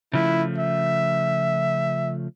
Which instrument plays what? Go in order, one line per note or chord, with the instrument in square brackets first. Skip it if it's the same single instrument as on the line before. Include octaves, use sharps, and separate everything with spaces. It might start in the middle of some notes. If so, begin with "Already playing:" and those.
[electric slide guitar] C#3 F3 A3 [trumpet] E4
[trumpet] E5